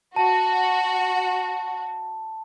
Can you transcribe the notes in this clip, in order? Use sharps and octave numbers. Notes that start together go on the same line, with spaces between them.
F#4 A5